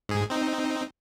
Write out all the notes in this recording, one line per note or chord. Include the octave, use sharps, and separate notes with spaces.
G#2 G#4
C4 D#4